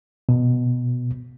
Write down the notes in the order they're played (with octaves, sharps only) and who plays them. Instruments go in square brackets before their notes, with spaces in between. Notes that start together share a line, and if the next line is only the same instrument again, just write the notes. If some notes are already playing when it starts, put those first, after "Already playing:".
[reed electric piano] B2